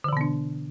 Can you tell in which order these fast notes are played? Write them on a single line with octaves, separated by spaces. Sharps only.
D3 E3 B2 B3 D4